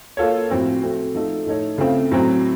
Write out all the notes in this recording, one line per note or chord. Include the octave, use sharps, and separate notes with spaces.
A#3 F4 A4 C#5
A2 F3 C4 F#4
A3 C4 F#4
F3 A3 D#4 A4
A2 A3 D#4 A4 C#5
C#3 A3 C4 F4
A2 F#3 C4 F#4